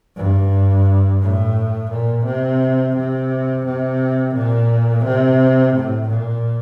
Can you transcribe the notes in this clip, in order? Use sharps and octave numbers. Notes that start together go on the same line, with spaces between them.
G2
A2
A#2
C3
C3
C3
A#2
C3
A2
A#2